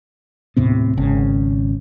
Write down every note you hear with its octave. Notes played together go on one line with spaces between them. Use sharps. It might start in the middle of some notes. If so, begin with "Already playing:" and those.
D#2 A2 C3 B3
G#1 C#3